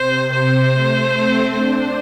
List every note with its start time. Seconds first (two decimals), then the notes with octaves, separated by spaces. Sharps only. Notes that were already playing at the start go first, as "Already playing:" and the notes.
Already playing: C3 C5
0.32 C5
0.72 A3
1.13 C4
1.54 D4 C5